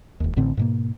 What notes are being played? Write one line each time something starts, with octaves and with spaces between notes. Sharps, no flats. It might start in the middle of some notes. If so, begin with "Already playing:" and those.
E1 D#2
A1 A2 D3 C4
G#2 B2 A#3